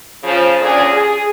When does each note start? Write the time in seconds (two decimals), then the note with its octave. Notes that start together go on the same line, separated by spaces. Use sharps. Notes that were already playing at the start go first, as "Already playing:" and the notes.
0.24 C#3 F3
0.62 A#2 D3 C#4 G#4
0.93 G#4